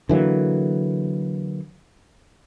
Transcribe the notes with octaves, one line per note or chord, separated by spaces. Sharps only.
D3 E3 F#3 A#3